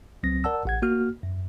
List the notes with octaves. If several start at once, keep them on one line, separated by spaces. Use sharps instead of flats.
C#2 F#3 C4 A#6
A#4 D5 F#5 A5 E6
A1 F#5 G#6
A#3 F#4 F6
F#2